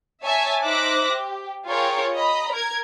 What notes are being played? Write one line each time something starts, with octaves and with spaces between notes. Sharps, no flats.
C#5 E5 G#5 A5
D#4 C5 E5 D6 F#6 A#6
G4
F4 G#4 A#4 C#5 G5
D#5 A#5 B5
A#4 G#6